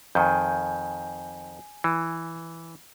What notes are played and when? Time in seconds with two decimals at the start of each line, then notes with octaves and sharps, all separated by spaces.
0.15 F2 D#3 G#5 G6
1.84 E3